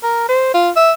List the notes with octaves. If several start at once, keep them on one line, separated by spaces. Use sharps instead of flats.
A#4
C5
F4
E5